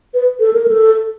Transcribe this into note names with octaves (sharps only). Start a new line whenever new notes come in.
B4
A4
A#4
A4